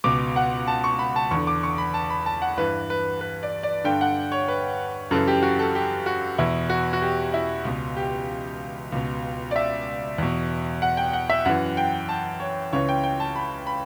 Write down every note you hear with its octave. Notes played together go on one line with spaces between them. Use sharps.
C#2 B2 D6
F#5
A5
C#6
B5
A5
E2 D3 C#6
D6
C#6
B5
A5
B5
A5
F#5
G2 E3 B4
B4
B4
D5
D5
G2 D3 G5
F#5
C#5
B4
F#2 C#3 E3 A4
G4
F#4
A4
G4
F#4
E2 B2 E4
F#4
F#4
G4
E4
C#2 B2
G4
C#2 B2
D5
E5
E2 B2
F#5
G5
F#5
E5
F#2 E3 F#5
G5
A5
C#5
C#2 C#3 E3 C#5
G5
G5
A5
B5
B5